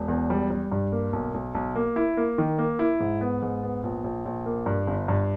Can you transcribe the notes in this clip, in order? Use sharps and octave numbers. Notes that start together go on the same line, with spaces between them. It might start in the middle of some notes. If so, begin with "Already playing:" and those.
Already playing: E1
E2
G3
G3
G2
A#3
B1
B1
B1
A#3
E4
A#3
D#3
A#3
E4
G#2
B3
G#2
B3
A#1
A#1
A#1
A#3
G2
G1
G2